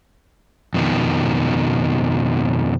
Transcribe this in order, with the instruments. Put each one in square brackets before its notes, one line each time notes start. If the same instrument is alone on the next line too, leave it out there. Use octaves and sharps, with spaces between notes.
[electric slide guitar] F2 B2 D#3